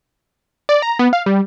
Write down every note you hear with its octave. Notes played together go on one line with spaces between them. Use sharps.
D5
A#5
B3
F5
G3